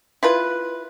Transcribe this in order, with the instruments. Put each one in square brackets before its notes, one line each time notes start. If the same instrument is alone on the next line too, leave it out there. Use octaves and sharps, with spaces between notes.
[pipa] E4 F4 B4